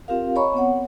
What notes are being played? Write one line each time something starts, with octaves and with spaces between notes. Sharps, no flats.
C4 F4 G4 A#4 F5
C#5 D#5 G#5 A#5 B5 C#6
B3 C4 C#5 F#5